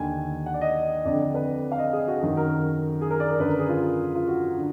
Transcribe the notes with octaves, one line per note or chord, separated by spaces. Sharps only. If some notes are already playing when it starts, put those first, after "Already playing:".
Already playing: D#2 D3 G#5
F#5
D5
D#5
F2 D3 D5
B4
F5
D#5
G#4
F#4
F#2 D#3 F#4
A#4
G#4
A#4
D5
A#4
F#2 D3 B4
A#4
G#4
F4
F4
F#4
D3